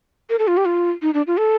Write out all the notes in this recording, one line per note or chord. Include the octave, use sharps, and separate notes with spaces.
A#4
A4
F4
G4
F4
D#4
D4
F4
A4